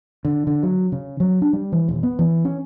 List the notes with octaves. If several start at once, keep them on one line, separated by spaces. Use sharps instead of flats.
D3
D3
F#3
C#3
F#3
D4
G3
E3
D#1
B3
E3
C#4